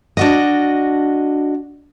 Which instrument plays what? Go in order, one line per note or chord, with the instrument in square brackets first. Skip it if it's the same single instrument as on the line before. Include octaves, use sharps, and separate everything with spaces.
[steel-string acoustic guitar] D4 F#4 D#5